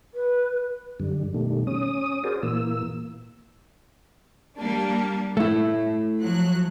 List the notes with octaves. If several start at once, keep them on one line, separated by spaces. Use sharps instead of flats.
B4
F#2 D3 G3
B2 D#3 G3 A3
C#4 D#6
F#4 G#4 A#4 C5 D5
A#2 E3 A#3 E6
G3 A#3 D4
A2 A3 E4
F3 F#3 F#6